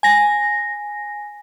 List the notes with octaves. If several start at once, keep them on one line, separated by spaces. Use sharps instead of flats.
G#5 A#6